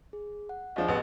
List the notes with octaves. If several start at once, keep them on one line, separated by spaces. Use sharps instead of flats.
G#4
F#5
D#2 F3 D4 G#4 D#5
A1 B3